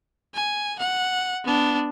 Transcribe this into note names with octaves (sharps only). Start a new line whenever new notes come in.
G#5
F#5
B3 D4